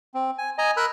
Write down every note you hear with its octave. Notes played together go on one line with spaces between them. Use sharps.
C4
G#5
D#5 G#5 A#5
A#4 B5 E6 F#6